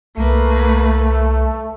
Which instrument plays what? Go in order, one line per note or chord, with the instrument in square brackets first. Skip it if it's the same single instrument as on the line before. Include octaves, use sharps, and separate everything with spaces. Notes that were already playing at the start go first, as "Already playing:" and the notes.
[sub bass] C2 [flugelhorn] A3 [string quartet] A#3 B4